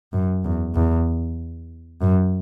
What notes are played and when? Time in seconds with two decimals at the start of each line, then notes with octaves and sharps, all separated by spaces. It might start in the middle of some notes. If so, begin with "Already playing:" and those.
0.13 F#2
0.44 E2
0.75 E2
2.02 F#2